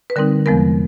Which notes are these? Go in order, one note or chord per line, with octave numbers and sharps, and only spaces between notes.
B4
D3 G3 C4 D#4 A#4
E2 C3 F3 G#3 B3 A#4